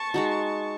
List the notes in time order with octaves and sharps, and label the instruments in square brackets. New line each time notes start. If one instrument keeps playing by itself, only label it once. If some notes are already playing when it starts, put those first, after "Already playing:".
Already playing: [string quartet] A5 C#6
[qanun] G#3 D#4 F#4